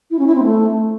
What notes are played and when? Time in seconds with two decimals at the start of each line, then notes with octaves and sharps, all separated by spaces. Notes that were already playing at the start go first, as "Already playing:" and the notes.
0.11 E4
0.19 C#4
0.27 E4
0.35 C4
0.43 A3